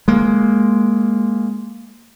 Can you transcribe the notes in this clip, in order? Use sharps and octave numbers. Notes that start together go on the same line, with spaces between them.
G#3 A#3